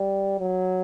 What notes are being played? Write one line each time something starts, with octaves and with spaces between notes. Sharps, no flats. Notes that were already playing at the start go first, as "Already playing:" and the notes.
Already playing: G3
F#3